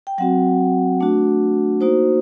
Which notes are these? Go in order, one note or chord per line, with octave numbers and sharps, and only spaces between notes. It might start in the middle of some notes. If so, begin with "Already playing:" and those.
G5
F#3 C4 F#4 F#5
A3 D4 F#4
A#3 D#4 F#4 C5